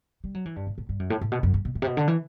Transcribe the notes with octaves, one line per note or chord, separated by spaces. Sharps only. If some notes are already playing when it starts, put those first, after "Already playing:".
G3
F#3
E3
G2
A2
A2
G2
F#2
A2
A2
B2
F#2
G2
B2
A2
C3
B2
D3
E3